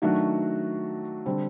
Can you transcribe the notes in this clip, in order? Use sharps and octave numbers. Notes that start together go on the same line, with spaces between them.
D#3 F#3 A3 D4 F#4
D3 G3 C4